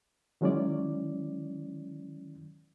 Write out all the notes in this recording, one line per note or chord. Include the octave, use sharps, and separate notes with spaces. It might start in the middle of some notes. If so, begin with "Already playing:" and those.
D#3 F#3 G#3 C#4 E4 D5